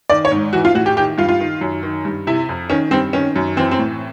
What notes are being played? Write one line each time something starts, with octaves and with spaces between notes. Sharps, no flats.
D#3 D5
C#5
G#2
E3 F#4
F4
A2 F#4
G4
D#3 G4
G2 F4
F4
D#3
F#2
D#3
G2
C3 E4
F2
D#3 C#4
G2 C4
D#3 C#4
F#2
E3 C4
C4
A2